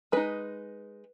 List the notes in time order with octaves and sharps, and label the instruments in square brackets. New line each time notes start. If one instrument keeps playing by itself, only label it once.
[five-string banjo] G#3 D#4 B4